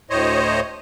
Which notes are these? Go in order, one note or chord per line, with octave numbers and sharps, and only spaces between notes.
D2 A2 C5 C#5 D#5